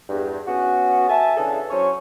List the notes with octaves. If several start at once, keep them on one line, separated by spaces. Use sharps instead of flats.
E2 G2
B3 C#4 F#4
E5 G#5 A5
C#3 E3 D4 G#4 A4
F#3 C#4 C5 C#5